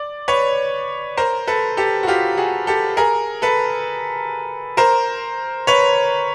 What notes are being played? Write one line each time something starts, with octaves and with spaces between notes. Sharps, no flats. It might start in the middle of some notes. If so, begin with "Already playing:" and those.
Already playing: D5
B4 C#5
A#4 C5
A4 B4
G4 A4
F#4
F4 G4
F#4 G#4
G4 A4
G#4 A#4
A4 B4
A#4 C5
B4 C#5